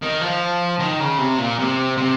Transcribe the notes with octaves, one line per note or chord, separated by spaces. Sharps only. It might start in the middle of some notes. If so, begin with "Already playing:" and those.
D#3
F3
D#3
C#3
C3
A#2
C3
C3